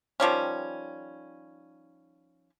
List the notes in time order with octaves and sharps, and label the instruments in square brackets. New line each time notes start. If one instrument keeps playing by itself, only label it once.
[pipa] D#3 F3 G3 C#4